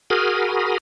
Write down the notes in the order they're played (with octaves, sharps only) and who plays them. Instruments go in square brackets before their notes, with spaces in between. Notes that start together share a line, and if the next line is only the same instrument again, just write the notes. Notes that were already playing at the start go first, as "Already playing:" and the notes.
[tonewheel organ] F#4 G#4 A#4 B5 D#6 F6